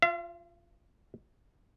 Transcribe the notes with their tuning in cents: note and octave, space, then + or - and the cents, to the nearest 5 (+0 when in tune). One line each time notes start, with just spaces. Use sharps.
F4 +0 F5 -45